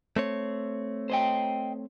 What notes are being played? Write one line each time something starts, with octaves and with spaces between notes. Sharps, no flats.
A3 C4 C#5
C5 D#5 G5